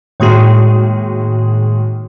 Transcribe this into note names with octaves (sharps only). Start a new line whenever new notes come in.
A2 D#3 G#3 A#3 F#4 G#4